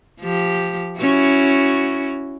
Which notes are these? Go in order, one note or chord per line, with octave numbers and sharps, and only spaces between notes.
F3 G4
C#4 E4 F#4